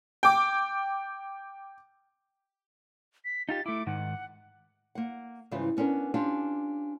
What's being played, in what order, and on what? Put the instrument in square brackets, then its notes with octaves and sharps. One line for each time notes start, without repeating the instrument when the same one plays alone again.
[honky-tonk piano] G5 D6
[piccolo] B6
[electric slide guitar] D#4 F4 G4 [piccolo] A6
[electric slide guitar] A3 E4 [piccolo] D6
[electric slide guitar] G#2 D#3 [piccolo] F#5
[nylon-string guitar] A#3 F#5
G#2 C#3 E3 G3 E4 F4
B3 C#4 D4 F#4 A#4
C#4 D4 F4 G4